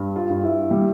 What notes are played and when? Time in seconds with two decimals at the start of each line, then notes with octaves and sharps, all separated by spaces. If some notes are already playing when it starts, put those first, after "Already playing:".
Already playing: G2
0.16 F4
0.30 G2
0.44 E4
0.71 G3